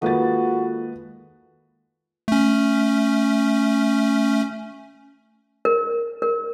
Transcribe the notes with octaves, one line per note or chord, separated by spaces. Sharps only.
D#3 G#3 A#3 F4 F#4 A4 B4 A6
A3 C#4
A#4
A#4